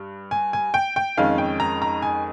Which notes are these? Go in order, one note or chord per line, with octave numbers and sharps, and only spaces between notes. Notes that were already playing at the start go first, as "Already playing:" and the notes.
Already playing: G2
G#5
G#5
G5
G5
F2 D#3 G#3 C#4 F5
G5
A#5
A#5
G#5